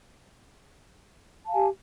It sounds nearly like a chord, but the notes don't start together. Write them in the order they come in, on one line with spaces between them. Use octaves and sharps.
A5 F5 G#5 G4